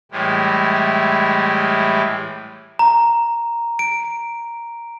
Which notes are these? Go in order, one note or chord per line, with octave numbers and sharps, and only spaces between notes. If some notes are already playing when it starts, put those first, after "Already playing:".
A2 E3 G3 G#3
A#5
D7